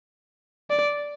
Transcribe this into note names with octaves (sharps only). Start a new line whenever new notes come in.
D5